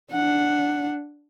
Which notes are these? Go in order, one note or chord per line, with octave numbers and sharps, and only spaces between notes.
D4 F#5